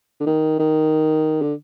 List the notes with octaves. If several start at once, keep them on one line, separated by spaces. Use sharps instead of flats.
D3
D#3
D#3
D3